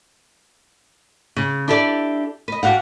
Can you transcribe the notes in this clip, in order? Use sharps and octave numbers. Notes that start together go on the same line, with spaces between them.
C#3
D4 E4 G4 A4 B4 D5
B4 D#5
D4 F#4 G4 F5 F#5